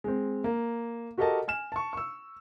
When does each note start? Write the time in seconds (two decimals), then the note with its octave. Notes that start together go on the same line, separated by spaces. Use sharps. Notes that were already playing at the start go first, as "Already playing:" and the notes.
0.04 G#3 C4
0.44 A#3
1.18 F#4 G4 A4 A#4 D#5 A5
1.48 G#5 F6 E7
1.72 A5 C#6
1.93 C#6 E6